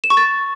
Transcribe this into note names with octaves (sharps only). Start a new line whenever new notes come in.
E7
C#6
A6